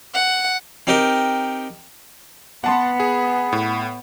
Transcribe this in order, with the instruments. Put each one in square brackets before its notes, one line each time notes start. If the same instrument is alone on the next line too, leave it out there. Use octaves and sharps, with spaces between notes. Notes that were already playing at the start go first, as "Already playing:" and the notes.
[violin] F#5
[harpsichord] C4 D#4 G4 A#4
[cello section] B3 [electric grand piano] F#5 A5 C6
[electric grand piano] G#4
A2